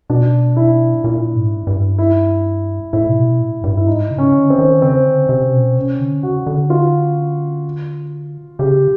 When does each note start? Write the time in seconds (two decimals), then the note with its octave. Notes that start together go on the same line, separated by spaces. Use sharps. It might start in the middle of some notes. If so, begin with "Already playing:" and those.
0.09 B2 D4
0.57 E4
1.04 A#2 E4
1.35 G#2
1.67 G2
1.98 E4
2.93 A2 E4
3.09 C3
3.16 B2
3.40 A2
3.64 G2
3.77 E4
3.87 G#2 D#4
4.11 C#3
4.18 C#4
4.34 D3
4.50 C4
4.59 D#3
4.82 C#3 C4
5.05 D3
5.29 C3
5.53 B2
5.76 C3 C#4
5.99 D3
6.23 C#3 F#4
6.47 D3
6.70 F4
8.59 C#3 G4